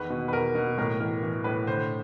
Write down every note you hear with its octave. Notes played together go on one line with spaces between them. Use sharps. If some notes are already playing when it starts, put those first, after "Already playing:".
Already playing: E2 D#3 B4
B2
B4
E2 A#4
B2
A2 A#4
E3 A#4
E3
A2 B4
D3 C5